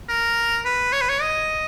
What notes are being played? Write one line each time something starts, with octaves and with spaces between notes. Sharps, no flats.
A#4
B4
C#5
B4
C#5
D#5